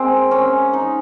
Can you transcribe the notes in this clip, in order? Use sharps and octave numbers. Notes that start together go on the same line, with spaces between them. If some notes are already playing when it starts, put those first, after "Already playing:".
Already playing: G#3 A#3 C4 G#4
C#4
D#4